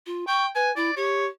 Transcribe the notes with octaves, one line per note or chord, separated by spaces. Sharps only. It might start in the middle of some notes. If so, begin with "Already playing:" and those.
F4
G5 C#6
B4 G#5
E4 D5
G4 C#5